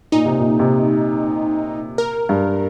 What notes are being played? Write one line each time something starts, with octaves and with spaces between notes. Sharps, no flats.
A#2 D#4
C3
A#2
C3
A#4
G2